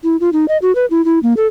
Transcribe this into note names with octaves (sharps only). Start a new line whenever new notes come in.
E4
F4
D#4
D#5
F#4
B4
E4
E4
A#3
A4